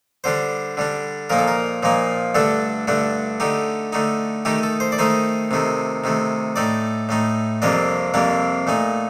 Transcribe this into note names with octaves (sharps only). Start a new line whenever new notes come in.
D3 G3 D4 C5
D3 G3 D4
A#2 F3 A#3 D#4 A#4
A4
A#4
A#2 F3 A#3 D#4
G2 D3 A3 D4 A4
G2 D3 A3 D4
D3 A3 D#4 G4
D3 A3 D#4
D#3 A3 D#4 G4
A4
C5
D5
D#3 A3 D#4 C5
C3 D#3 A3
C3 D#3 A3
A2 A3 D#4 D5
A2 A3 D#4
F2 C3 G3 A#3 D4 D#5
F2 C3 G3 A#3 D4
A#2 A3 D#4